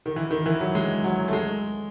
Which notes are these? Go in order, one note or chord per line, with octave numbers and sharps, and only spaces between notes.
D#3
E3
D#3
E3
F#3
G#3
F#3
A3
G#3